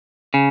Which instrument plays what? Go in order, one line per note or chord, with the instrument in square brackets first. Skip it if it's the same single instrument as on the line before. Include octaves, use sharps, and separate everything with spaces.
[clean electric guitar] C#3